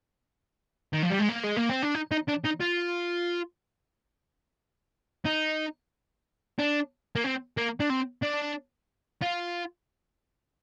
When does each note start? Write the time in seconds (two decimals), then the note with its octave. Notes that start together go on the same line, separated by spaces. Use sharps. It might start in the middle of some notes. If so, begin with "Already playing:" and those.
0.93 D#3
1.03 F3
1.11 G3
1.20 G#3
1.29 A#3
1.44 G#3
1.57 A#3
1.70 C4
1.83 D4
1.95 D#4
2.12 D#4
2.29 D4
2.45 D#4
2.61 F4
5.26 D#4
6.59 D4
7.15 A#3
7.24 C4
7.57 A#3
7.80 D4
7.90 C4
8.23 D4
9.22 F4